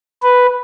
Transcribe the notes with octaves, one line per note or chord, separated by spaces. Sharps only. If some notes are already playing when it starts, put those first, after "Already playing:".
B4